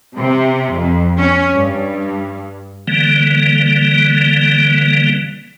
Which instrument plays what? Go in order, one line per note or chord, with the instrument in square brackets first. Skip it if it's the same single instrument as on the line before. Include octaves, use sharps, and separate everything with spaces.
[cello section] C3
F2
C#4
G2
[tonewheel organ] D3 E3 G3 A#3